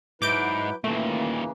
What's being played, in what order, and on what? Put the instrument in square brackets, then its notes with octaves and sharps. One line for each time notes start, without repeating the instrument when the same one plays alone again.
[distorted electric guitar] G#2 [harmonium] F#3 E4 B4 [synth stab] D6 G6 D7
[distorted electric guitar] D#2 A#2 [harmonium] C#3 E3 A#3 [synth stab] A3